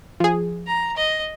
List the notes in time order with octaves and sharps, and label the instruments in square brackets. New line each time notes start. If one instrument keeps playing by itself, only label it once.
[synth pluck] F3 G#4
[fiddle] A#5
D#5